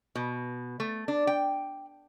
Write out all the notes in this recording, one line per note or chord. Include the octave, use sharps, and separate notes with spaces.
B2
A3
D4
G5